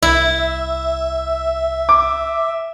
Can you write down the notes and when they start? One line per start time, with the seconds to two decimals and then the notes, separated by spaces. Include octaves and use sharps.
0.02 C2 E4 E5
1.89 D6